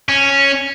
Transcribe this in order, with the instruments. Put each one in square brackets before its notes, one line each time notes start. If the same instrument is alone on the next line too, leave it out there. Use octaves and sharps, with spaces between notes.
[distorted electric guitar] C#4